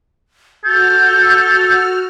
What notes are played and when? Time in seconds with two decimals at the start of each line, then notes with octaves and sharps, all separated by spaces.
0.65 F#4 A4 F6 G6